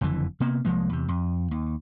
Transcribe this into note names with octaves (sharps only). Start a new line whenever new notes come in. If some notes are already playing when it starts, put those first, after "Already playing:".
F#1 F2 D3 E3
C3 A#3 B3
C2 F3 G#3 A#3
E2 C3
F2
D#2